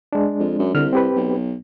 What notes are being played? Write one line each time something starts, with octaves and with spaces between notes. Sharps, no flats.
G#3 D4
F2
F#2
C2 D3 F6
C4 G4 B4
B1